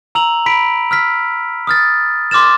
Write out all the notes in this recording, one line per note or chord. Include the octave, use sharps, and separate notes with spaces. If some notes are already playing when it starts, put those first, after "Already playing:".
A#5 E6 F7 F#7
B5 B6 D7
E6 F6 B6
D#6 F6 A6
C6 D6 F6 A6 E7